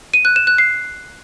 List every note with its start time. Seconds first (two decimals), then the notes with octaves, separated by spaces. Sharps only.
0.14 D#7
0.25 F#6
0.36 E7
0.47 F#6
0.58 C7